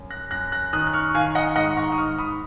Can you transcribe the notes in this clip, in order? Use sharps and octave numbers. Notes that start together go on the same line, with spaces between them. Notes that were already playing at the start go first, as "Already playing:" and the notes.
Already playing: F#2
F#6 A#6
F#2 F#6 A#6
F#6 A#6
D#3 D#6 F#6
F#6
C#6 F6
D#3 F5 G#5
D#5 F#5
G#2 D#5 F#5
A#5 C#6
D#6
G#2 C#6 F6
B5 D#6